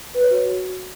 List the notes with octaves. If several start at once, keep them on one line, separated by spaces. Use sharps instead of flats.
B4
C#5
F#4